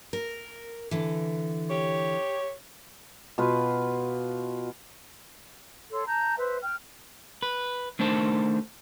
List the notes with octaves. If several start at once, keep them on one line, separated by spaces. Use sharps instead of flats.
A#4
D3 E3
G4 C#5
B2 F4 B4
A4 C#5 C6
A5 A#5 G6
B4 C5 E5
G5 F6
B4
D#3 A3 D4 C5 A5